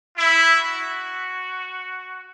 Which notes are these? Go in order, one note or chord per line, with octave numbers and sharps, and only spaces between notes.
E4
F#4